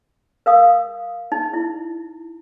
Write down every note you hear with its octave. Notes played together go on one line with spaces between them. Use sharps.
A#4 F5 D#6
D#4
E4